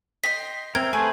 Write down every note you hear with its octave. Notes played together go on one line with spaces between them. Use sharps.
D#5 G5 C6 B6
C4 A#4 E5 G#6
A3 G#4 B4 C5 G#5